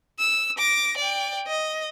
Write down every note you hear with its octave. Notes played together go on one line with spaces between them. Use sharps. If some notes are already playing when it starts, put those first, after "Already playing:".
E6
D6 A#6
D5 G5
D#5